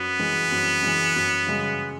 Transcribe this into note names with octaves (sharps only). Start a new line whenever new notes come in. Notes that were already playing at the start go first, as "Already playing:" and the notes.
Already playing: F#2 B3
E3 G#3
F#2
E3 G#3
F#2
C#3 G#3